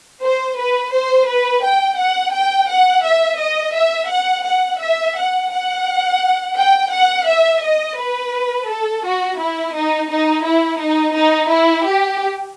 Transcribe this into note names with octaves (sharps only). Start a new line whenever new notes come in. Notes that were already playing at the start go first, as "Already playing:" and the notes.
C5
B4
C5
B4
G5
F#5
G5
F#5
E5
D#5
E5
F#5
F#5
E5
F#5
F#5
G5
F#5
E5
D#5
B4
A4
F#4
E4
D#4
D#4
E4
D#4
D#4
E4
G4